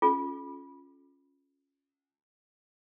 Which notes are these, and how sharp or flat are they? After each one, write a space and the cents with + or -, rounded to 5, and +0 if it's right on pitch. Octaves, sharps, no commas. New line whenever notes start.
C#4 +0 F4 +0 G#4 +45